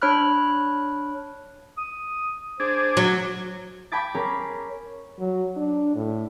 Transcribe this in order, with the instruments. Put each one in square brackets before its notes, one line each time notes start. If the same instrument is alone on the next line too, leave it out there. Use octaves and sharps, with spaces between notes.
[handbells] D4 C#5 B5 F6 F#6
[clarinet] D#6
[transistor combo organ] D4 G#4 [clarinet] C5
[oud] F#3
[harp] G5 A5 B5 D6 G#6 A6
C#4 G#4 A#4
[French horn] F#3
D4
A2